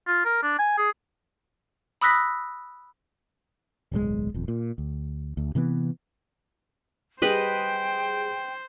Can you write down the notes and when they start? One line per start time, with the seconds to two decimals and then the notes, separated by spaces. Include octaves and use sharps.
0.07 F4
0.25 A#4
0.43 D4
0.59 G#5
0.78 G#4
2.01 B5 D#6 E6 F#6 A#6 B6
3.92 D1 B1 C3 G#3
4.34 D#1 F2
4.48 A#2
4.78 D2
5.37 D2
5.55 C3 E3 F3 B3
7.22 G3 G#4 B4 C5 D#5 G5